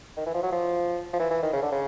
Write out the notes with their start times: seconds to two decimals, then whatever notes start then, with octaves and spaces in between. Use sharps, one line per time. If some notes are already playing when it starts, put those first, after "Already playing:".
0.17 D#3
0.26 E3
0.34 F3
0.43 F#3
0.52 F3
1.13 F3
1.19 E3
1.30 E3
1.43 D#3
1.53 C#3
1.62 D3
1.72 C#3